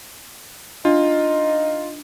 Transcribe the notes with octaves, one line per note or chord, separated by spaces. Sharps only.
D4 D#4 F4